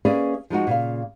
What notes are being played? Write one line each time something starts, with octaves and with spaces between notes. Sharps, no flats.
A#3 C#4 G#4 B4 D5 E5
F3 G#3 D#4 F#4
A#2 C#3 F5